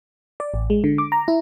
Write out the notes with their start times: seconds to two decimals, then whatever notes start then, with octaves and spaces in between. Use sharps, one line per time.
0.40 D5
0.54 A1
0.70 G#3
0.84 D3
0.98 D6
1.12 A#5
1.28 E4